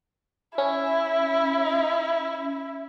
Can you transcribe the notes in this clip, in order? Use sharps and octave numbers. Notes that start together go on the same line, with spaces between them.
C#4 E4